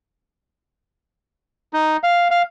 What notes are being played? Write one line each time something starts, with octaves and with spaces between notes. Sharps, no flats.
D#4
F5
F5